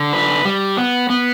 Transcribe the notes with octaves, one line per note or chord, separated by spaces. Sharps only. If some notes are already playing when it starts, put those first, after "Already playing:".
Already playing: D3
B4
G3
B3
B3